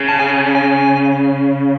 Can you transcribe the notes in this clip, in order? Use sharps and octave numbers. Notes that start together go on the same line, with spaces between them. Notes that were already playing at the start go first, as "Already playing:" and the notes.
Already playing: C#3
A5
G#5
G#5